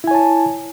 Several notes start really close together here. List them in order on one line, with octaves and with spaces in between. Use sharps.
E4 G#5 C#5 A5